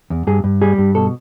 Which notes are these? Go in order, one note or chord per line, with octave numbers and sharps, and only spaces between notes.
E2
G2 G#4
G2
G3 G#4
G2
B2 A4